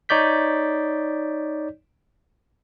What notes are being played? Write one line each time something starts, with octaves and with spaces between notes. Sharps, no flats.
D#4 C#5 D5 G6 B6